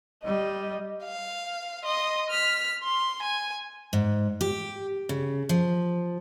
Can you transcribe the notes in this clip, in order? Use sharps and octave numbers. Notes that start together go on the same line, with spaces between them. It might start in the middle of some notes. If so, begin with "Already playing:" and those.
G3 D#5
F5
D#5 C6
F6 B6
C6
G#5
G#2
G4
C#3
F3